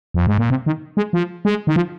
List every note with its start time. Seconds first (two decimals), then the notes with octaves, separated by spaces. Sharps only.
0.14 F2
0.27 G#2
0.38 A#2
0.50 C3
0.66 D#3
0.97 G#3
1.13 F3
1.45 G#3
1.67 D#3
1.76 F3